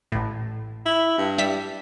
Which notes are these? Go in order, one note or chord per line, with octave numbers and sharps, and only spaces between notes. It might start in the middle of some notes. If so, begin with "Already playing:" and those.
A1 A2
E4
G2
G3 E5 B6